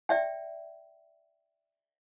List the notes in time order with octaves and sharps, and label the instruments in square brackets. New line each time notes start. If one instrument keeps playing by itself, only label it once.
[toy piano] D5 E5 G5